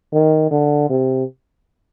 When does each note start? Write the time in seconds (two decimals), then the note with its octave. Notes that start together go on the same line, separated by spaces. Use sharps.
0.13 D#3
0.51 D3
0.89 C3